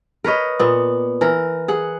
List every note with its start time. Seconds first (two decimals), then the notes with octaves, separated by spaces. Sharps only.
0.24 A#4 B4 C#5 D#5
0.60 A#2 B3
1.21 E3 A#4
1.68 G#4 F#5